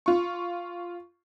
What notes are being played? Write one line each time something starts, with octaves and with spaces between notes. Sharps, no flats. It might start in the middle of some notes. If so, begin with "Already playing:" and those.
F4 C#6